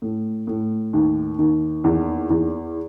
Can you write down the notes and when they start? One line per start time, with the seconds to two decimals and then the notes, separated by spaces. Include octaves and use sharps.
0.02 A2
0.47 A2
0.93 D#2
1.38 D#2
1.84 E2
2.30 E2